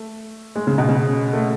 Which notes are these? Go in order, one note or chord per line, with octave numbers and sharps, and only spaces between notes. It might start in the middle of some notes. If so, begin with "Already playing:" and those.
Already playing: A3
G#3
C#3
B2
C#3
A3